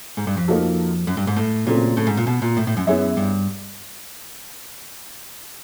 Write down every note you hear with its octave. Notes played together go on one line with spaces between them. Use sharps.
G#2
G2
F2
F3 A#3 D#4 F#4 A4
F#2
G2
G#2
A2
A#2 C#3 F#3 A3 C4
A2
G#2
A#2
B2
A#2
A2
A2
F#2
F#2 B3 E4 G#4 C#5 E5
G2